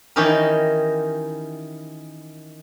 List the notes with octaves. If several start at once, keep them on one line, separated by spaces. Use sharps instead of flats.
D#3 E3 C#4 D#4 G4 A#4